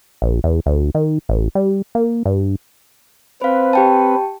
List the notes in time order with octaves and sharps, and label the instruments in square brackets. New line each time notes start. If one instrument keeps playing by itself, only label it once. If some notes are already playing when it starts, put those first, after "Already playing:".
[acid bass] A#1
E2
D2
D#3
A1
G3
A#3
G2
[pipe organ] C4 B4 [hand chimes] C5 F5
[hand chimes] G4 G5 A5